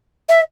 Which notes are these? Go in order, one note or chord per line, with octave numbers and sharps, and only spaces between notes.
E5